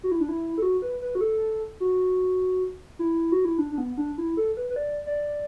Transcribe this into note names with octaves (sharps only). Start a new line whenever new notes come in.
F#4
E4
D4
E4
A4
F#4
B4
B4
F#4
A4
F#4
E4
F#4
E4
D4
D4
B3
D4
E4
A4
B4
B4
D5
D5